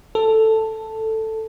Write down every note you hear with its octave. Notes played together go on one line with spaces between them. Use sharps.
A4